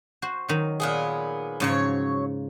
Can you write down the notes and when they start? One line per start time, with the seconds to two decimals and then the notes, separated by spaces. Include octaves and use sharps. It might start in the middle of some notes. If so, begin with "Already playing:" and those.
0.22 F#4 C5
0.48 D#3 F#3
0.80 A#2 B3 G#4
1.60 G#2 C#3 F3 F#3 C#5